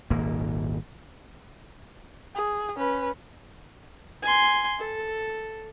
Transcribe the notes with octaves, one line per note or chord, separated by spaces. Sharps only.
D#1 G#1 G#2 A#3
G#4
C#4 B4
G#5 C6
A4